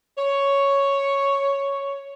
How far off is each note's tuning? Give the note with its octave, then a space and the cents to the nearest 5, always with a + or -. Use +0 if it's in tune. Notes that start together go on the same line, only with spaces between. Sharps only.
C#5 +0